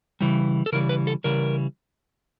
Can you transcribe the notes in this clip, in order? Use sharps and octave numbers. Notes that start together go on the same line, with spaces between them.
C#3 E3 G3
A4
C#3 E3 G3 A#4
B4
A4
C#3 E3 G3 A#4